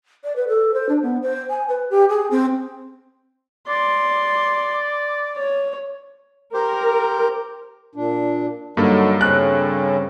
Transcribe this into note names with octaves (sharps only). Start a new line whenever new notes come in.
D5
B4
A4
C5
D4
B3
C5
G#5
B4
G4
G#4
C4
D5 C6
C#5
G4 A#4 C5
A#2 D4
G2 D3 F#3 A#3 D#4 A4
C#3 C4 C#4 F#6